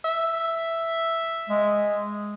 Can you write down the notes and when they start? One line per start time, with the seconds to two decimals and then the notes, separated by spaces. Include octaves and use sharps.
0.05 E5
1.50 G#3